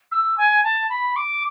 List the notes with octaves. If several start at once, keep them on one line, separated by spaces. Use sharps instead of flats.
E6
G#5
A5
B5
D6